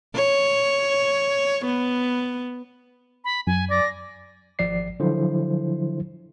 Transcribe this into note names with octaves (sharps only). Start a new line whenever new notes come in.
C#5
B3
B5
F#2 G#5
D5 A#6
G#1 F3 D5 C7
D3 F3 F#3 E4 C5